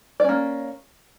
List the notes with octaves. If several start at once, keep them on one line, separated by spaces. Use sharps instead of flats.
A#3 C#4 D5